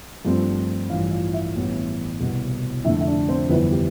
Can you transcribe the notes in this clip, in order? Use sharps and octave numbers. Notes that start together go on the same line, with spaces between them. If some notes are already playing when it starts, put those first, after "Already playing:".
G2 F3 A3 C4
A1 G2 E3 F4 F5
F4 F5
E4 E5
A1 G2 E3 B3
C2 B2 B3
F2 D3 A3 E4 E5
E5
D4 D5
C4 C5
G1 F2 E3 B3 E4 B4
G4